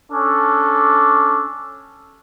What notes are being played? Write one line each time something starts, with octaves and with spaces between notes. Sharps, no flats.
C#4 D4 A4